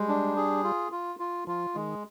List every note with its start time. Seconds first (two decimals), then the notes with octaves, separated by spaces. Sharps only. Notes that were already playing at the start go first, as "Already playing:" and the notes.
Already playing: G3 G#3
0.09 D4
0.36 G#4
0.64 F4
0.92 F4
1.19 F4
1.47 F3 F4
1.75 D#3 G#3